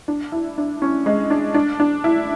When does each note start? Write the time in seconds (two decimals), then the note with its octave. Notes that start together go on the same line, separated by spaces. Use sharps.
0.08 D4
0.32 E4
0.58 D4
0.82 C#4
1.06 G#3
1.30 D4
1.54 D4
1.80 D4
2.04 E4